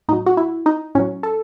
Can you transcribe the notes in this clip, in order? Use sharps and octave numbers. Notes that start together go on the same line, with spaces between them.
A2 F#3 D#4
F#4
E4
D#4
A2 F#3 C#4
A4